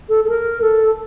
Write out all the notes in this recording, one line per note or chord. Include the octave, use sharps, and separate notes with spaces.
A4
A4
A#4
A4